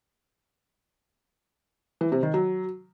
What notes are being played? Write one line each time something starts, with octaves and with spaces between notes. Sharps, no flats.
E3
C3
D#3
F#3